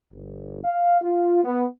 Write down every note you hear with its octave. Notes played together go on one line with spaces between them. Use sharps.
G1
F5
F4
B3